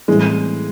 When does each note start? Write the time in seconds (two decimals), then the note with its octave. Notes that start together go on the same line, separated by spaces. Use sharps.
0.08 A2 E3 G3 G#3 C4 E4